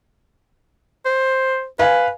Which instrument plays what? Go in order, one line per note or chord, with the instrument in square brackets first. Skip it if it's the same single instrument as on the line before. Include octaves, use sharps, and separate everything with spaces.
[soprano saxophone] C5
[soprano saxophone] B4 [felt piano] F5 G#5